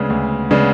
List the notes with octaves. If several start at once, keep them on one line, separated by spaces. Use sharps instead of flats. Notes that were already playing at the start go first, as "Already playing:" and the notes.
Already playing: D2 C#3 G#3 B3 D4
D2
C#3 G#3 B3 D4